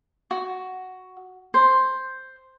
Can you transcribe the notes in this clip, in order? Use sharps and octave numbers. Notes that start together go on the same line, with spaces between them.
F#4
C5